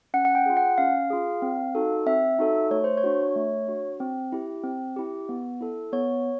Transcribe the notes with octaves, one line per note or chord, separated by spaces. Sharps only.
C#4 F#5
F#5
G5
F4 G#4
F#5
C#4 F5
F4 G#4
C4
D#4 F#4 A4
C4 E5
D#4 F#4 A4
A3 C#5
C5
C#5
D4 F#4
A3
D4 F#4
C4
E4 G4
C4
E4 G4
B3
E4 A4
B3 C#5